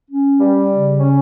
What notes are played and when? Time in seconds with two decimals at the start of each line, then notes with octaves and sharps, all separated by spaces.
0.10 C#4
0.40 G3
0.70 C#3
1.00 C#4